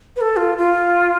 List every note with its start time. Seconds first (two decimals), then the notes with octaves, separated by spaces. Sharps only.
0.16 B4
0.21 A4
0.37 F4
0.58 F4